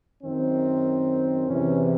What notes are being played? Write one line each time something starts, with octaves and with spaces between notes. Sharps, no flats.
F#2 D#3 C4
E2 C3 E3 C#4